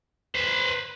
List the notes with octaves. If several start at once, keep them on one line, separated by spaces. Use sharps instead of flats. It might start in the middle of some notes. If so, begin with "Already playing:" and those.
B4 C5